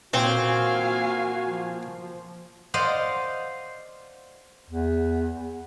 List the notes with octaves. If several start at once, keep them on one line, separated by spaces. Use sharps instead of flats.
A#2 C4 F#4 F5 G#5
F3
C5 D5 D#5 F5 F#5
E2